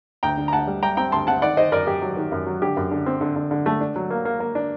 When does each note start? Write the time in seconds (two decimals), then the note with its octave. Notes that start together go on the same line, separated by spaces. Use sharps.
0.23 D2 G5 A#5
0.37 D3
0.48 A#5
0.53 D2 F#5 A5
0.67 G3
0.83 G3 G5 A#5
0.97 C4 G5 A#5
1.12 D2 A5 C6
1.27 C4 F#5 A5
1.42 D#3 D5 F#5
1.57 D#3 C5 D#5
1.72 F#2 A#4 D5
1.87 F#2 G4
2.02 F#3
2.17 D#3
2.32 F#2
2.46 F#3
2.62 D3 G4
2.76 F#2
2.91 D3
3.06 C4
3.21 D3
3.36 D3
3.51 D3
3.66 A3
3.81 D4
3.96 F#3
4.10 A#3
4.25 A#3
4.40 A#3
4.55 D4